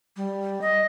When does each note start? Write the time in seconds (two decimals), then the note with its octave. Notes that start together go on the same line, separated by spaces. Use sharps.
0.17 G3
0.61 D#5